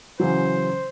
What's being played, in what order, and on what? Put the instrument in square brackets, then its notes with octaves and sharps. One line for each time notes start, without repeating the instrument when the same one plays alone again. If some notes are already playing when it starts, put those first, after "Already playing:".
[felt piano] C#3 E3 F#3 [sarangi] C5